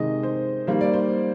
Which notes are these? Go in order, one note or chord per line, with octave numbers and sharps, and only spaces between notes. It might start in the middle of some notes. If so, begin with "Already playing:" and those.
Already playing: C3 D#3 G#3 D#5
C5
D#3 G3 A#3 C5
D5
C5